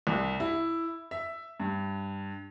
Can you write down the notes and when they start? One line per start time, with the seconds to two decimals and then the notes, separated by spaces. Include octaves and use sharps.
0.07 C2
0.40 E4
1.11 E5
1.60 G2